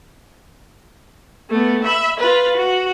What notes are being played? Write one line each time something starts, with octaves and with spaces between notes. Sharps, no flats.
A3 B3
E5 B5
F4 B4
F#4